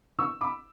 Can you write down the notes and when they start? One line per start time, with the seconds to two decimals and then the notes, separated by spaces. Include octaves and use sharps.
0.19 C#6 E6
0.41 B5 D6